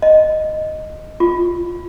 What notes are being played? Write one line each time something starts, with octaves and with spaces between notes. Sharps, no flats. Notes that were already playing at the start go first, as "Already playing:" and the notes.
D#5
F4